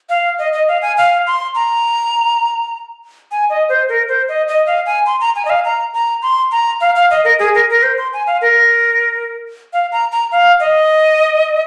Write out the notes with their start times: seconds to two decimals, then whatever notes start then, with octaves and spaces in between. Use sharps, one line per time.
0.09 F5
0.39 D#5
0.53 D#5
0.68 F5
0.82 G#5
0.97 F5
1.27 C6
1.55 A#5
3.31 G#5
3.50 D#5
3.69 C5
3.89 A#4
4.08 C5
4.28 D#5
4.48 D#5
4.67 F5
4.86 G#5
5.06 C6
5.20 A#5
5.36 G#5
5.45 D#5
5.50 F5
5.65 A#5
5.94 A#5
6.22 C6
6.51 A#5
6.81 F5
6.96 F5
7.11 D#5
7.24 A#4
7.39 G#4
7.55 A#4
7.69 A#4
7.83 C5
7.98 C6
8.13 G#5
8.27 F5
8.41 A#4
9.73 F5
9.92 A#5
10.12 A#5
10.32 F5
10.60 D#5